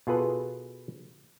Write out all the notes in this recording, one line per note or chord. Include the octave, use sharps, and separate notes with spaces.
B2 F4 G#4 A4 B4